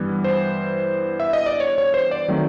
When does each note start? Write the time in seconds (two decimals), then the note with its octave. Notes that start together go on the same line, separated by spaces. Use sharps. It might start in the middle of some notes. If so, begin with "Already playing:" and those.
Already playing: G2 E3 G3 B3 E4
0.24 C5
1.20 E5
1.33 D#5
1.46 D5
1.60 C#5
1.78 C#5
1.94 C5
2.11 D5
2.28 D#3 F#3 A3 C4